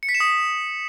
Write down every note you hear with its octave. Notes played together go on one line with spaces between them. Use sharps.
C#7
B6
E7
D#6